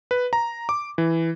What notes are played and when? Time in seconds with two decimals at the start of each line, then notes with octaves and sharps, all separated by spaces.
0.11 B4
0.33 A#5
0.69 D6
0.98 E3